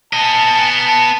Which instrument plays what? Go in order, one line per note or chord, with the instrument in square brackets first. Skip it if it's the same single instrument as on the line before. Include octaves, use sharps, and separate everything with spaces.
[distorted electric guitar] B3 D#5 [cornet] A5